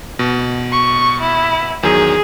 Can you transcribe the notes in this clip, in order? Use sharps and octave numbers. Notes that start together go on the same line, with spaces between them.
B2
C#6
E4
E2 D#3 F#3 G#4